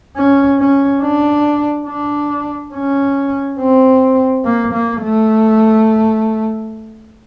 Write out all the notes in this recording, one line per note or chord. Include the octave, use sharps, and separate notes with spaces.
C#4
C#4
D4
D4
C#4
C4
A#3
A#3
A3